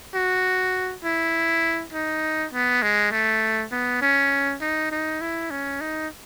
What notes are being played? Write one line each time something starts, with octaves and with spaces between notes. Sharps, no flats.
F#4
E4
D#4
B3
G#3
A3
B3
C#4
D#4
D#4
E4
C#4
D#4